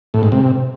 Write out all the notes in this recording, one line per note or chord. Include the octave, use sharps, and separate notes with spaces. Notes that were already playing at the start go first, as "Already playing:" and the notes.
A2
G#2
C3